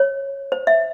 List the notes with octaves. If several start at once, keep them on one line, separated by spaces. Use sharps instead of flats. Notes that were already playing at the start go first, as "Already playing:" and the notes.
Already playing: C#5
C5
E5